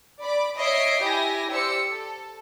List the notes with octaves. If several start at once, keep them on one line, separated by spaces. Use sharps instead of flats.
D5 B5 D6
C#5 D#5 E5 C7 D7
E4 G4 G5 G#5 A#6
G4 C5 D5 E6 C#7
A4